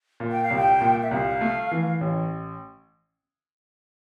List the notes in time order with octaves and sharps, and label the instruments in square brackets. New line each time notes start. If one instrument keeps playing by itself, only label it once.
[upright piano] A#2
[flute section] G5
F5
[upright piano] C2
[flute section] G5
[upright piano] A#2
[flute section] E5
[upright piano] C2 [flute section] F5
[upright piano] A3
E3
A1